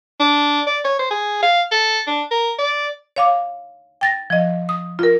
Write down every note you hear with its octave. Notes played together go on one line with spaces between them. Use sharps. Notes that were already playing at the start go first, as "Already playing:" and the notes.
D4
D5
C#5
C5
G#4
F5
A4
D4
A#4
D5
C#5 F5 D6
G5 A6 A#6
F3 D#5
D#6
F4 A#4